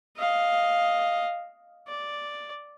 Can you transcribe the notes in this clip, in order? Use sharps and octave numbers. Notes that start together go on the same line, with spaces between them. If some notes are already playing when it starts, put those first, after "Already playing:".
D#5 F5
D5